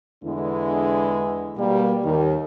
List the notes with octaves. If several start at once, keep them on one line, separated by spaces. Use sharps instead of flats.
E2 D3 G#3 B3 D4 E4
B2 G3 A#3
D#2 D#3